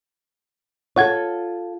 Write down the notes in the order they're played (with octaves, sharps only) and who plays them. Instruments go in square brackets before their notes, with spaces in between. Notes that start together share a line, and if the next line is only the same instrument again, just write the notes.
[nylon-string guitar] F4 A4 [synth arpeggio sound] C#5 F#5 G#6